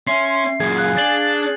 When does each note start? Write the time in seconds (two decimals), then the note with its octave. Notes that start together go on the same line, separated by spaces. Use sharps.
0.07 C#4 E5 C6 C7
0.60 F#2 A#2 G#4 G#6
0.78 F5 F#6
0.97 D4 A6 F#7